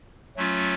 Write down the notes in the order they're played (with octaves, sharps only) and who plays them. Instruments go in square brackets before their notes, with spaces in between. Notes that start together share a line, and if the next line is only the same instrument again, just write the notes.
[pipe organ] F#3 A3 C#4 F4